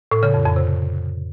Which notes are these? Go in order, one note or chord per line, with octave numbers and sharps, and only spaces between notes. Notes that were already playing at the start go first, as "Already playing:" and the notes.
A2
C#3
F2
F2
C3